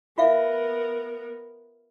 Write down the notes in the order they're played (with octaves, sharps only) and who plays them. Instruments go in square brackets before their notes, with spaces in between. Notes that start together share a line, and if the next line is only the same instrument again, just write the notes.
[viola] B3 A#4 [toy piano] F4 E5 F5